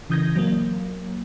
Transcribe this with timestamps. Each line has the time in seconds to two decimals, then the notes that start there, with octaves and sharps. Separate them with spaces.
0.10 C#3 E3 D#6 G6 G#6 A#6
0.36 F#3 A#3